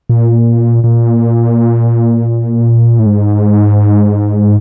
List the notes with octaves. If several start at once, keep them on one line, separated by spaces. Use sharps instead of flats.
A#2
A#2
A2
G#2